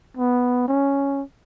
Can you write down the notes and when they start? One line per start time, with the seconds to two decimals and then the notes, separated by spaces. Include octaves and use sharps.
0.17 B3
0.68 C#4